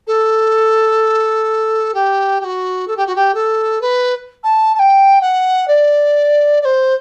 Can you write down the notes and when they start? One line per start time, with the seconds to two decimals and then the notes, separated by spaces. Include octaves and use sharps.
0.07 A4
1.94 G4
2.41 G4
2.44 F#4
2.88 A4
2.97 G4
3.07 F#4
3.16 G4
3.34 A4
3.81 B4
4.44 A5
4.75 A5
4.79 G5
5.21 F#5
5.68 D5
6.62 D5
6.65 C5